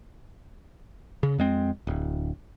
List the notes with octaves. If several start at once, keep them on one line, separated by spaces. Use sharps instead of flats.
C#3
F2 G#3 C4
D1